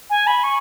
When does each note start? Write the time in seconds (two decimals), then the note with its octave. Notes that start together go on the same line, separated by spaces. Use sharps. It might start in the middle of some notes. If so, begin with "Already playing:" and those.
0.10 G#5
0.27 B5
0.44 C#6